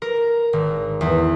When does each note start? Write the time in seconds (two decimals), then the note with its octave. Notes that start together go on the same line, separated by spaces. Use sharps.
0.02 A#4
0.53 G#1
1.01 E2